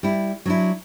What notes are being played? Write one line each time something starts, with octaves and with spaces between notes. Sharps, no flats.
G3 E4
F#3 D4 E4